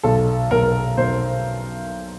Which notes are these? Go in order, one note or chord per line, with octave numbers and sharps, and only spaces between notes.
B1 A4
B1 A#4
B1 C5